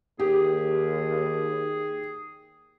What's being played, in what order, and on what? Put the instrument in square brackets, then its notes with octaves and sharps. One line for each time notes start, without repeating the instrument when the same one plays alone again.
[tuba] D#2 [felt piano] G4 [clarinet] G#4